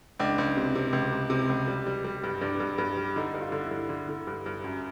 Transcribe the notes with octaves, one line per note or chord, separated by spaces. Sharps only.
C#2 D4
C#2
C3
C3
C#2
C3
C3
C#2
G3
G3
G3
G2
G2 D4
G2
G2
G3
D3 D#4
G2
F4
D3
E4
G2
D3
D3
G2
G2
F#2